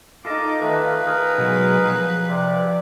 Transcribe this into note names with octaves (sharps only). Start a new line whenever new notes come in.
D#4 F4 A4 D#5 D6
D#3 A3 B4 F5
D#4 G#4 A#4
B2 F#3 G#3
F3
C3 D5